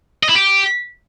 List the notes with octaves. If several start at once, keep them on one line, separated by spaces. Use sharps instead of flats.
D#5
E4
G4